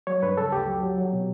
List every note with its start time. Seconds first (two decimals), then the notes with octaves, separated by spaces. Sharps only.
0.07 F#3 C#5
0.23 G2 B4
0.37 C#3 A4
0.52 D2 G4
0.67 F#3
0.83 F#3
0.98 F#3
1.13 B2